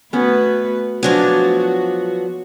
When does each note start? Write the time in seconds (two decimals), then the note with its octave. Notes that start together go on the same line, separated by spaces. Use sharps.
0.13 A3 B3 C#4 F#4 B4
1.03 F3 F#3 B3 D4 F#4 G#5